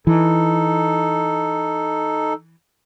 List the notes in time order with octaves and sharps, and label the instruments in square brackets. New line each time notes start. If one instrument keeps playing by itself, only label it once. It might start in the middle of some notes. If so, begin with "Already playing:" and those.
[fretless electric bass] E3 [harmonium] D#4 A4